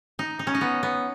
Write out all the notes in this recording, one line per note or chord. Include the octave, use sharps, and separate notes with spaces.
D#4
D#4
C#4
D#4
B3
B3